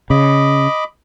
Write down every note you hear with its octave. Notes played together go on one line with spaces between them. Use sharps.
C#3 D#5 B5 D6